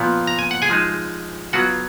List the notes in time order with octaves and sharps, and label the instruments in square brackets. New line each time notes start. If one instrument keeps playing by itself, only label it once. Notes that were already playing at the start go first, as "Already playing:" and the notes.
Already playing: [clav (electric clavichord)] A#2 F3 B3
A#5
G#5
F#5
G#4 G#5
F3 G#3 D#4
F#3 B3 F4 F#4 F#5